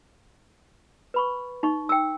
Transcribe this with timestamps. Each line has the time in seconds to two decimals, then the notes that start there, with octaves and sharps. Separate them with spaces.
1.14 B4 B5 C#6
1.63 D#4 C#6
1.89 G5 E6